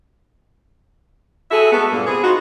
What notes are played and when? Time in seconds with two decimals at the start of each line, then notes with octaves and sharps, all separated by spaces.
1.51 F#4 G#4 A4 E5
1.72 G#3 A3 B3
1.91 G2 A#2 A#3
2.07 C3 B3 G#4
2.24 D#4 F4 F#4